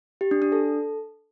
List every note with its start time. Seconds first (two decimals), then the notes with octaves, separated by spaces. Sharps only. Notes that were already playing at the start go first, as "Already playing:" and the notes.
0.21 G4
0.31 D4
0.42 D4
0.52 A4